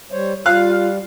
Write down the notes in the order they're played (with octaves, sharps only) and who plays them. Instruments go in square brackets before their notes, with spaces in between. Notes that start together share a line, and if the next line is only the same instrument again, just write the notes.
[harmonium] G3 C5 C#5
[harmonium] G3 [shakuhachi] F4 [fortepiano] F5 F#6